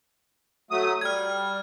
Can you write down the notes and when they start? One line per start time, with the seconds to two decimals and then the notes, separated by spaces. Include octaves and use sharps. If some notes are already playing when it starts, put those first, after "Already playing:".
0.71 F#3 A3 D#6
1.01 G3 F6 G#6